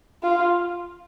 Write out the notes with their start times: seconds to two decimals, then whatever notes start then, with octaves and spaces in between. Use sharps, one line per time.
0.23 F4